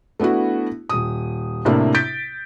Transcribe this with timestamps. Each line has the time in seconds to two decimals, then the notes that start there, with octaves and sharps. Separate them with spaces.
0.20 A3 B3 D4 E4 F#4
0.90 D#1 D#6
1.65 A2 C3 A#3 D4 E4
1.95 G6 A6 B6 D7